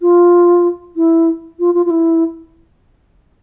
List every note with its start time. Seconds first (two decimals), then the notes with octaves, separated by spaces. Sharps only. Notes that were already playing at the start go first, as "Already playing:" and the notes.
0.02 F4
0.96 E4
1.60 F4
1.75 F4
1.86 F4
1.91 E4